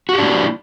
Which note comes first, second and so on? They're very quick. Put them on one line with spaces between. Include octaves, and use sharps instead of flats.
F#4 G4 D4 A#3 E4